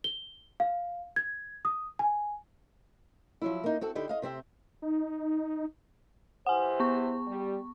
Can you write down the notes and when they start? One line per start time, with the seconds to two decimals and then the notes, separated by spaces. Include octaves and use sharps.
0.04 G7
0.60 F5
1.16 G#6
1.65 D#6
1.99 G#5
3.42 F3 F#3 E4
3.64 A#3 D#4
3.81 C4 F#4 A4
3.95 D3 D#4 E4 G4
4.09 D#5 F5
4.22 C3 C4 G4 E5
4.82 D#4
6.46 E3 G4 C5 F#5 G#5
6.80 B3 C#6
7.26 G3